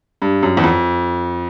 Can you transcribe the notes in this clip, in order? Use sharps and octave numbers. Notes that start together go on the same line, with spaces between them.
G2
F#2
E2
F2